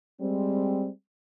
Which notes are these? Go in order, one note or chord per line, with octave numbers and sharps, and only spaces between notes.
G3 G#3 C4